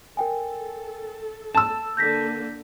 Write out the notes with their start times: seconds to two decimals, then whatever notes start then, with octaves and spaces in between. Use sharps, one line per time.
0.17 A4 A#4 G5 G#5
1.55 A5 E6 E7
1.97 D3 A#3 G6 A#6 B6